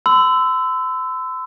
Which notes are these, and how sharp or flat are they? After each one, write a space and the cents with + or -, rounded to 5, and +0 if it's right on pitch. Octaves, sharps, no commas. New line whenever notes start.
C6 -45 E6 +0